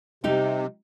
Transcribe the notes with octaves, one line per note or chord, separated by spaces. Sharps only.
C3 G3 D#4 G4